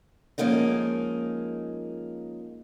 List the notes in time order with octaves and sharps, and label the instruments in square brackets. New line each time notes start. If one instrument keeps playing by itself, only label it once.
[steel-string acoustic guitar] F3 G#3 A#3 C#4 D#4